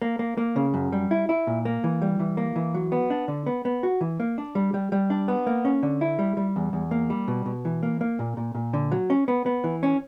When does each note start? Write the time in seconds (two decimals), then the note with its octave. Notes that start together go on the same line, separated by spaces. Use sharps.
0.02 A#3
0.19 A#3
0.38 A#3
0.56 C#3
0.74 F#2
0.92 G3
1.11 E4
1.29 E4
1.47 A#2
1.65 A#3
1.84 E3
2.02 G3
2.20 E3
2.37 A#3
2.56 E3
2.74 F#3
2.92 B3
3.10 D4
3.28 D3
3.46 B3
3.65 B3
3.83 F#4
4.01 E3
4.20 A#3
4.38 D4
4.55 G3
4.74 G3
4.92 G3
5.10 D4
5.28 B3
5.47 A#3
5.65 C#4
5.83 D3
6.01 E4
6.19 G3
6.37 G3
6.56 E2
6.73 E2
6.91 A#3
7.10 G3
7.28 B2
7.46 B2
7.65 E3
7.83 A#3
8.01 A#3
8.19 A#2
8.37 A#2
8.55 A#2
8.73 D3
8.92 F#3
9.10 C#4
9.28 B3
9.46 B3
9.64 E3
9.83 C#4